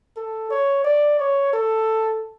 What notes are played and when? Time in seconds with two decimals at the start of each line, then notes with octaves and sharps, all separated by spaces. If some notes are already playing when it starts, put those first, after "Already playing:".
0.17 A4
0.50 C#5
0.84 D5
1.19 C#5
1.53 A4